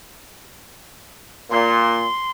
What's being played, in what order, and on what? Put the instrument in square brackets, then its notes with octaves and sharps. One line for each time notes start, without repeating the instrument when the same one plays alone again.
[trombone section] A#2 [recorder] C6